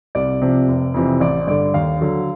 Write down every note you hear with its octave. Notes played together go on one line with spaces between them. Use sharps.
C2 D5
C3 F3
F1
F2 C3 E3
A1 D5
G2 D3 D5
D#2 F5
D3 F#3